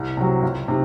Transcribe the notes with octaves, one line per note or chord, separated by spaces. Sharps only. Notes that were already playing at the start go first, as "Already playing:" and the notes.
Already playing: C2
C3 F#3
C#2
C3 D#3